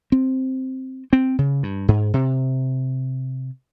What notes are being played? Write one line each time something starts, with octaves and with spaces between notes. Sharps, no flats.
C4
C4
C#3
G2
G#2
C3